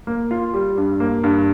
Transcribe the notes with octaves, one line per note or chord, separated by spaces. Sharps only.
A#3
F4
G3
G2
A#3
G2